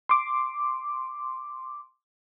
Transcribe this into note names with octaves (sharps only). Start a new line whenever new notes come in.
C6 D6